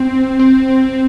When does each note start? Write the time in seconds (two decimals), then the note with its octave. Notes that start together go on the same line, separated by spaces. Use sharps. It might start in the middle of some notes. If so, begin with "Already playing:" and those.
Already playing: C4
0.39 C4